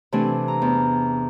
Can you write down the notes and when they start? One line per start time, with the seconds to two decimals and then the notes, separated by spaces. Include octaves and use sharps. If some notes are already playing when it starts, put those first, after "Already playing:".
0.12 C3 E3 A3 D4 G#5
0.48 A#5
0.62 E2